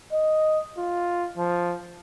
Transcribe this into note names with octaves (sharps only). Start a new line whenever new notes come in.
D#5
F4
F3